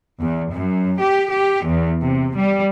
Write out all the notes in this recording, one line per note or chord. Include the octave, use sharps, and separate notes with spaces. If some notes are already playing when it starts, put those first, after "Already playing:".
E2
F#2
G4
G4
E2
C3
G3